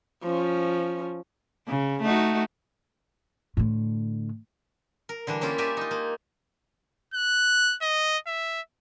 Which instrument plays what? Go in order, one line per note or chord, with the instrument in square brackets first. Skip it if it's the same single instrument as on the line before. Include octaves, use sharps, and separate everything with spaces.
[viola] F3 C#4
[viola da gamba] C#3
A3 D#4 F#4
[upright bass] A2 D3
[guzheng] A#4
D3 E3 G3 D4
A#3 C#4 E4 F4 G4
G4 A#4 D5 E5 G#5
D#4 F4
A#3
[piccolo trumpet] F#6
D#5
E5